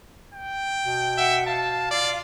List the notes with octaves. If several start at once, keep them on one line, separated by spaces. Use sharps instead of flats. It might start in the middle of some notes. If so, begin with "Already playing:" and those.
G5
B2
E5 F#5
F5 A5
F4 D5